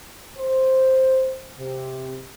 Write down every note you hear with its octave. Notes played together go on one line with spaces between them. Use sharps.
C5
C3